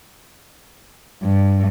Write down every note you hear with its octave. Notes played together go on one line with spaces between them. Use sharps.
G2